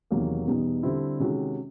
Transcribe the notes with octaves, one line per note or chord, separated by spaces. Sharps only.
E2 C3 D#3 F#3 A#3
E2 B2 G3 B3 D#4
D3 G3 C4 E4
C3 D#3 G#3 C#4 F#4